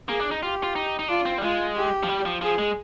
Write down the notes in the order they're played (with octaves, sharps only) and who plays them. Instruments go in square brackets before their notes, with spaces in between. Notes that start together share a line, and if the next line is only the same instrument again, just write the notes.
[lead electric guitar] A#3 [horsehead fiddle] G#4
[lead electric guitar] D4
D#4
[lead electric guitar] F4 [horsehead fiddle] G4
[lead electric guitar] F4
D#4
D#4
[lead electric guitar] D4 [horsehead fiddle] F4
[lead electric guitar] C4
G3
[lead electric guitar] G#3 [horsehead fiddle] F4
[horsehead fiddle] G4
[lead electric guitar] F3
G3
F3
[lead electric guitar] F3 [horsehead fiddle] G#4
[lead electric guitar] G#3